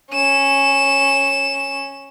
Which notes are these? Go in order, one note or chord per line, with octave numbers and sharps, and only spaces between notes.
C#4 E7